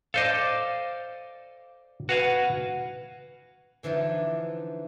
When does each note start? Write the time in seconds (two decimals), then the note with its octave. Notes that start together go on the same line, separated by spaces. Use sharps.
0.14 A4 C5 D5 D#5 F5
2.09 F#4 B4 F5 F#5 G#5
3.83 D3 E3 F3 D4 D#4